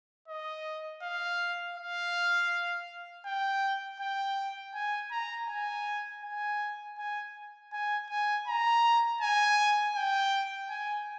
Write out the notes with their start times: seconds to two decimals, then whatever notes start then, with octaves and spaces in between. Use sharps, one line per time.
0.28 D#5
1.02 F5
1.76 F5
3.26 G5
4.00 G5
4.74 G#5
5.11 A#5
5.49 G#5
6.24 G#5
6.98 G#5
7.72 G#5
8.10 G#5
8.47 A#5
9.21 G#5
9.95 G5
10.70 G#5